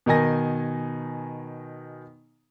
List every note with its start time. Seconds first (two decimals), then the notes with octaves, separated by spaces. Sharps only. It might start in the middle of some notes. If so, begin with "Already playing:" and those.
0.06 B2 D#3 D#4 G#5 A#6